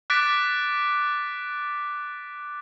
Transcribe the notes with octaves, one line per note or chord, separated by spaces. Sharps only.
D6 F#6 A6 B6 D7